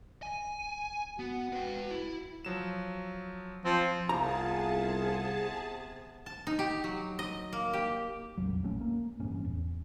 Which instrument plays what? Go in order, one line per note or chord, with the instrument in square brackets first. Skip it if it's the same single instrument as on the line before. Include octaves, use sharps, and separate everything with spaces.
[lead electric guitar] G#5
[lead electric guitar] B3 [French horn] F#4
[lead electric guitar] B4 G5
E4
[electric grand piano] F3 F#3 E7
[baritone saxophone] F3 [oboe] C4
[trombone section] C2 F4 [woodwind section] C3 B3 [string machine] G#4 A5 [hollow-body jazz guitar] A#5
[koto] A5
D#4
G4
F#3
D#5
A#3
G4
[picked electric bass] E1 A#1 F2 F#3
A#1 A3 C#4
A#3
A1 G2 C#4
E2